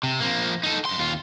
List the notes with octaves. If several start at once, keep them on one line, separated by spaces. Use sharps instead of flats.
C3
F3 A#3
D#4 A4
F#2 C6
D#2 F4